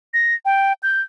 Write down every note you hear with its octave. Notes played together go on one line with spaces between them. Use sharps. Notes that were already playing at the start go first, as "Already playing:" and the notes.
A#6
G5
G6